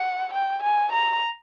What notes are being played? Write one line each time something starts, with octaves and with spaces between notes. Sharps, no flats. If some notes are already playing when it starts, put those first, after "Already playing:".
Already playing: F#5
G5
G#5
A#5